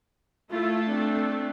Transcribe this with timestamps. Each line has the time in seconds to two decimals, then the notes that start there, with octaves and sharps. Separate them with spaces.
0.51 A3 E4 F4
0.86 C4 D4